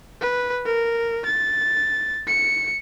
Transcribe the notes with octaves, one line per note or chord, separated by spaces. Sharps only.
B4
A#4
A6
C#7